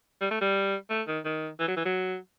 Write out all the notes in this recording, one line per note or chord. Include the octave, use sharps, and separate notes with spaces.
G3
A3
G3
A3
D#3
D#3
E3
F#3
E3
F#3